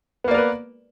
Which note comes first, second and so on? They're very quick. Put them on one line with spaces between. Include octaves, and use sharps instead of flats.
B3 A#3 D5 A#4 B4